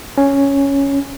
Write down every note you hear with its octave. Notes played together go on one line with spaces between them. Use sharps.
C#4